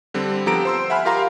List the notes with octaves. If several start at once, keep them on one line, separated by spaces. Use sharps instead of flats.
D3 G3 C4
F3 B3 G4 A4 A#5 D7
C5 C6 E6
E5 F#5 G#5 B5 F6
F4 G4 A#4 F5 A#5 C6